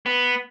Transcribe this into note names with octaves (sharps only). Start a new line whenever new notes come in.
B3